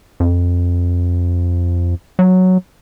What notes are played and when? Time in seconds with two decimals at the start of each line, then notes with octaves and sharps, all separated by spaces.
0.20 F2
2.19 F#3